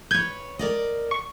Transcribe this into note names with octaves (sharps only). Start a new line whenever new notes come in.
B4 C#5 G6 G#6
A#4 D5 D#5
C#6